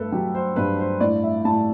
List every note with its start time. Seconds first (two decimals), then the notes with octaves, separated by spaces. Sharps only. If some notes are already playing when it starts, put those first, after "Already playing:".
Already playing: G2 A3 A4 B4
0.12 F#3 G4
0.35 C5
0.56 G2 B4
0.79 C5
1.00 A2 D5
1.23 E5
1.45 A2 A5